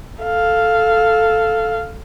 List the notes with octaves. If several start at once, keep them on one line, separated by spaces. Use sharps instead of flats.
A4 F5